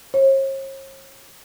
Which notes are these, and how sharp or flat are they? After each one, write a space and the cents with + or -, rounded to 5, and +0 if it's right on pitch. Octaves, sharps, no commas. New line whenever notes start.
C#5 -45